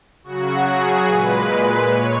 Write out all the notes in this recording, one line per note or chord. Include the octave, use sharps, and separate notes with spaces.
C#3 F#3 F#4
G#4
A#2 G#3 B4
A#2 C#5